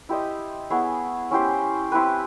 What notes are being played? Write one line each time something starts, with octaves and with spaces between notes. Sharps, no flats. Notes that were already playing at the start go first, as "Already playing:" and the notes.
E4 G4 C5 D#5
B3 E4 G#4 C#5
C#4 E4 G4 C5
C4 E4 G4 B4